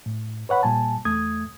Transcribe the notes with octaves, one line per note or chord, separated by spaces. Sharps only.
A2
B4 C#5 F#5 B5
A#2 G3 G#5 A5
E2 A3 D#6 G#6